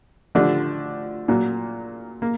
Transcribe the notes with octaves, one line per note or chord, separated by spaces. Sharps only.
D3 F3 A3 D4 G4
A#2 F#3 A#3
A#3